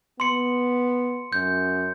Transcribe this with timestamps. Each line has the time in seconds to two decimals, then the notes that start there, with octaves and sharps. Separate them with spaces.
0.20 B3 C6 C#7
1.33 F#2 G6